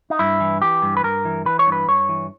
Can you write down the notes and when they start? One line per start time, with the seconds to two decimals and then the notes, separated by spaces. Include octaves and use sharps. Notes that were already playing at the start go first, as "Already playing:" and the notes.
0.10 D#4
0.19 G2 E4
0.40 E3
0.62 E3 G4
0.83 G2
0.97 B4
1.04 G2 A#4
1.25 E3
1.46 E3 B4
1.59 C#5
1.67 G2
1.72 B4
1.88 G2 C#5
2.09 E3